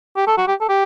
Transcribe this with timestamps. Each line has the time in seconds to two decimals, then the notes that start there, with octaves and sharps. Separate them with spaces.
0.16 G4
0.27 A4
0.38 F#4
0.48 G4
0.61 A4
0.69 G4